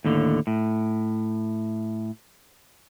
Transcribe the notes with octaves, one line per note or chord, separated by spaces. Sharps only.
D#2 A2 D3
A2